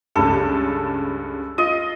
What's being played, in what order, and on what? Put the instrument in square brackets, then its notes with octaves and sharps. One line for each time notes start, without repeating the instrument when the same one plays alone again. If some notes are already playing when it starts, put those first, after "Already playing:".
[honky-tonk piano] C#2 G2 [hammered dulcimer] A4
[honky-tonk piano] F4 [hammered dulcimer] D#5